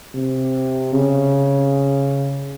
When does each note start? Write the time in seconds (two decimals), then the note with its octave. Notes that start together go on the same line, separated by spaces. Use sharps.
0.15 C3
0.93 C#3